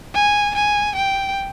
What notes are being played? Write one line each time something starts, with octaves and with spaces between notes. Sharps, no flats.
G#5
G#5
G5